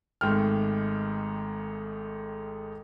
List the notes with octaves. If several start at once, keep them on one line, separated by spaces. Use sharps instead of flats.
G#1 G#2 D#3 A3 G5 F6